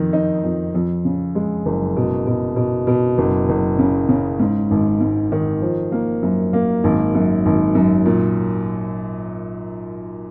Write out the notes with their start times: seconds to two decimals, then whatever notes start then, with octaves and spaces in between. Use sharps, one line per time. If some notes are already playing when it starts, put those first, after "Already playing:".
Already playing: F2 D#3
0.13 D#4
0.44 F2
0.74 F2
1.05 C#3
1.35 G#3
1.66 F#1
1.96 B2
2.27 B2
2.56 B2
2.87 B2
3.18 F#1
3.49 F#1
3.79 C#3
4.09 C#3
4.40 G#2
4.71 G#1
5.00 G#2
5.32 D#3
5.61 F3
5.92 A#3
6.22 F#2
6.53 A#3
6.84 G#1
7.14 F#2
7.46 G#1
7.75 F#2
8.06 A#2